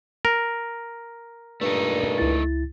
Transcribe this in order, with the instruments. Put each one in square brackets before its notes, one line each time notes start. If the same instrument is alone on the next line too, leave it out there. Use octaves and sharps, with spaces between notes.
[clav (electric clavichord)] A#4
[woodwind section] G2 A#2 [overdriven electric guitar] A3 D#4
[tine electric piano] C#2 E4 A6